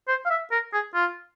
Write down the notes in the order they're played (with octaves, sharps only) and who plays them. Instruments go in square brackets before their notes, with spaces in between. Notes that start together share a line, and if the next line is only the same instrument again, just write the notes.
[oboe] C5
F5
E5
A#4
G#4
F4